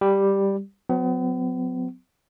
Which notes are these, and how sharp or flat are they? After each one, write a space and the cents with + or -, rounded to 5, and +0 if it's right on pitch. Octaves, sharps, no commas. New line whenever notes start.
G3 +5 G4 +0
F#3 -30 B3 +40